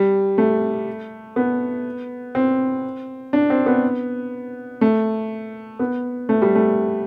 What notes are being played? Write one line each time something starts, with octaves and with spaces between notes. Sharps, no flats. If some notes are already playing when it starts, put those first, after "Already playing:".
Already playing: G3
A3
B3
C4
D4
C4
B3
A3
B3
A3
G3
A3